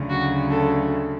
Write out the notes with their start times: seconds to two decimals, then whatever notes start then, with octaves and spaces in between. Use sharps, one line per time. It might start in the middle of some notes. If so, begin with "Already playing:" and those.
Already playing: D2 C#3 F#3
0.09 F#4
0.50 A4